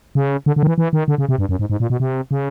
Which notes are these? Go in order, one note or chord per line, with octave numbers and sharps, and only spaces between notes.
C#3
D3
D3
D#3
E3
E3
D#3
D3
C#3
C3
G2
F#2
G#2
G#2
A#2
B2
C3
C#3